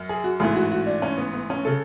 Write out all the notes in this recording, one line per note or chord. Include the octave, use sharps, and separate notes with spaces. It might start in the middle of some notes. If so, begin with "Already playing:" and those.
Already playing: F#2
G#4
F#4
A1 G#2 E3 G#4
F#4
F#4
D4
C#4
B3
B3
C#4
C#3 A4